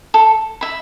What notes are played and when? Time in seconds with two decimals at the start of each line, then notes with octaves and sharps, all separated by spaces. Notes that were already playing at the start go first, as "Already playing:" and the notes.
0.14 A4
0.61 E5 B5